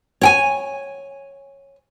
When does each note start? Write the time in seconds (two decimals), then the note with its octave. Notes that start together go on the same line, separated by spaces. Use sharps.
0.21 C#5 G5 G#5